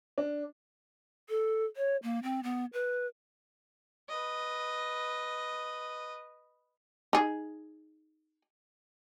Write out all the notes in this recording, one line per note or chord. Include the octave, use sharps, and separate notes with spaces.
D4
A4
C#5
A#3
C4
B3
B4
B4 D#5
D#4 G#4